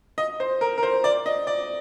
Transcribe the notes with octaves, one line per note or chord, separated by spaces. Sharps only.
D#5
C5
A#4
A#4
C5
D5
D#5
D5